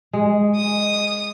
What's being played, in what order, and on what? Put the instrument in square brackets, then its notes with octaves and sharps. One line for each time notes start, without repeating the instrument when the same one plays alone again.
[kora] G#3
[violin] D#6